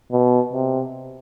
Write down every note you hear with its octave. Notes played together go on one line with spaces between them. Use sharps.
B2
C3